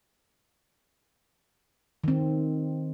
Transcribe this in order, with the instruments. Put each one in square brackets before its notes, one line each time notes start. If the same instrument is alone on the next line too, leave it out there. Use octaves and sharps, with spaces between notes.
[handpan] D#3 C4